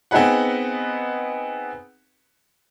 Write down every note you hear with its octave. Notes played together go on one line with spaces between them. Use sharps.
B3 C4 D#4 G#4 B4 F#5